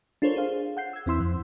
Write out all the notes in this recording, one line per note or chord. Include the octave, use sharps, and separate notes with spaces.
D4 F4 A4 A#4 C5 C#5
G#4 C5 F5
F#5 G6 C7
E6 G#6
E2 C4 E4 C6 E6
F2